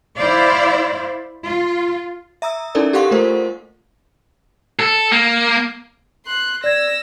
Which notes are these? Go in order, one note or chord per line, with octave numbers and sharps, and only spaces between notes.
E4 C5 D5 F5
F4
E5 A#5 D#6 E6
C#4 D#4 E4 A4 A#4 D5
G4 A4 F5 F#5 C6 C#6
A3 F4 A4 A#4 C5
A4
A#3
C6 F#6
D5 E6 G#6 A#6